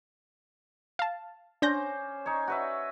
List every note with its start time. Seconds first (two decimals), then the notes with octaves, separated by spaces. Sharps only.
0.99 F5 A5
1.62 C#4 D4 C5 D6 G6 A#6
2.26 D#4 C#5
2.47 F#4 B4 E5